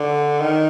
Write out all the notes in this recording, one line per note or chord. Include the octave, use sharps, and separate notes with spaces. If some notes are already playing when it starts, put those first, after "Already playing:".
Already playing: D3
D#3